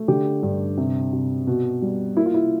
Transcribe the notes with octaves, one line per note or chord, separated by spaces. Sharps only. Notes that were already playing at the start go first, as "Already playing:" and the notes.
Already playing: A3
D3 G4
G2
C3
C3
B2
G3
A#3 E4
F4
E4